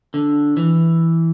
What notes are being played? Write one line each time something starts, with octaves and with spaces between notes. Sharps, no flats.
D3
E3